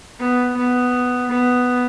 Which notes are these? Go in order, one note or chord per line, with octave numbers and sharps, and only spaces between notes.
B3
B3
B3